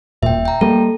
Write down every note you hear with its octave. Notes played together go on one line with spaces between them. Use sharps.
D#1 A#2 E5 G5
G5 A#5
G3 A#3 A4